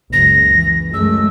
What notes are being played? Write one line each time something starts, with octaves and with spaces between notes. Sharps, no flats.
F#1 C#2 A#6
E3
F#2 G#3 A3 E6